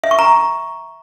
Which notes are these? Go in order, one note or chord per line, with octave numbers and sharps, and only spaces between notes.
E5
C#6
A#5